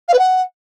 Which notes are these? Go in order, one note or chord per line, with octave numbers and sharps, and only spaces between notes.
F5
B4
F#5